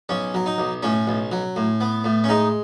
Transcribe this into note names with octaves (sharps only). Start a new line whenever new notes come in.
B1 C#4
F#3
D#4
B1
A2 C#4
B1
F#3
A2
B3
A2
C#4
G#3 D#4